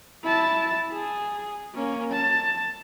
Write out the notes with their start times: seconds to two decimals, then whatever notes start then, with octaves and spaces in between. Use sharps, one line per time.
0.23 E4 A5
0.93 G#4
1.74 A#3 C#4
2.12 A5